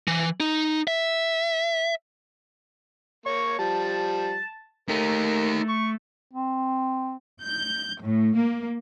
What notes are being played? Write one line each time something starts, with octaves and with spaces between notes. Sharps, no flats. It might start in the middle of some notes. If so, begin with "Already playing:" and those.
E3
D#4
E5
A#3 C#5 C#6
F3 G3 A5
A3 D#4 G4 A#4
C#6
C4
G6
A2
A#3